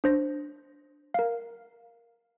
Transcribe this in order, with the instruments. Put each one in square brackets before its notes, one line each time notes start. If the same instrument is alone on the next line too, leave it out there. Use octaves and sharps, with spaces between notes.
[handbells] D4 C5 A#6
A#4 F5